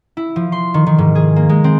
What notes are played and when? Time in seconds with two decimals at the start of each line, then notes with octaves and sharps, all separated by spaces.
0.17 E4
0.36 F3
0.52 C6
0.74 D#3
0.86 D#3
0.98 G#2
1.15 G#4
1.36 A#3
1.49 G#3
1.64 C4